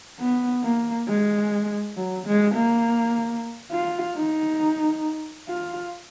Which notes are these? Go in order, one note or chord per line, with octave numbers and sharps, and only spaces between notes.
B3
A#3
G#3
F#3
G#3
A#3
F4
D#4
F4